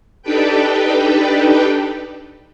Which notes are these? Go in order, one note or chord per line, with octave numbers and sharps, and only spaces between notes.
D4 D#4 G4 A4 B4 G5